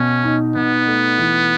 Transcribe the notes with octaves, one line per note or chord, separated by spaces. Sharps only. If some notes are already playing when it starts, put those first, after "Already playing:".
Already playing: B2 C#4
D#4
B2 B3
A3
E3